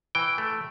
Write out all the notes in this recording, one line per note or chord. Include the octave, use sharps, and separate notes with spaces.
E3 G5
A3